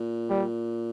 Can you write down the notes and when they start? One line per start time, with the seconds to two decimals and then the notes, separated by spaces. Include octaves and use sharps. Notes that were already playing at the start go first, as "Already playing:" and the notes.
Already playing: A#2
0.30 G3